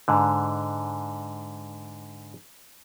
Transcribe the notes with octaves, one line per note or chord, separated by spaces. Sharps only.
G#2 D3